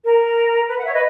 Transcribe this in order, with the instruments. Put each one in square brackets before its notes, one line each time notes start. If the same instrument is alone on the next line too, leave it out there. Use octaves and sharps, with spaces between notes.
[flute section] A#4
B4
F#5
C#5 E5
B4 D#5